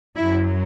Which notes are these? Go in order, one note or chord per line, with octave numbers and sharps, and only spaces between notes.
F#2 F#3 E4